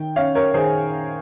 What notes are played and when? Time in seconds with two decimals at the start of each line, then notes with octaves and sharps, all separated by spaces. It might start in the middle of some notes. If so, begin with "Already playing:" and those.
Already playing: D#3 G5
0.16 C#4 C#5 F5
0.35 A#4 C#5
0.54 D#3 G#4 C5